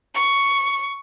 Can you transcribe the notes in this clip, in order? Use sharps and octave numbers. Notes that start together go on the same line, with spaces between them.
C#6